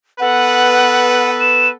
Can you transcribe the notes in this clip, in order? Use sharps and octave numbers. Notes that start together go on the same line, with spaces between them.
B3 A4 B4 F#5
E7